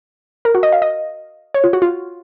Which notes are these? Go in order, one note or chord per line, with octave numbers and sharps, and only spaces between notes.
A#4
F#4
D#5
F5
D#5
C#5
F4
F#4
F4